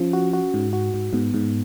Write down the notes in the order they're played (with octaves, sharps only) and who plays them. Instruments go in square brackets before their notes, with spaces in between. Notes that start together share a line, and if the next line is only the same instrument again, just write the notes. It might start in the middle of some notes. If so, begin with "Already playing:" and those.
Already playing: [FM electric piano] F3 [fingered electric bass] C#4
[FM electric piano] F#4
F#4
G#2
F#4
G#2
[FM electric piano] G#2 [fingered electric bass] B3
[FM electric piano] G#2